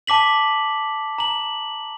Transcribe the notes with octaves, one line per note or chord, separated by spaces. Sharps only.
A5 D6 B6 F#7
A#5 F#7